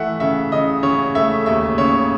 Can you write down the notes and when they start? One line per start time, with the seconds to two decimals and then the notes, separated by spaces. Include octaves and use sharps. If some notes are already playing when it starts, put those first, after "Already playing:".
Already playing: E3 A3 E5 F#5
0.20 C#3 E5
0.52 C#3 D#5
0.83 C#3 C#5
1.15 A3 E5
1.46 D#2 E5
1.78 C#3 C#5